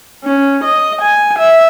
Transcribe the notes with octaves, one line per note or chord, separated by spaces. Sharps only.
C#4
D#5
G#5
E5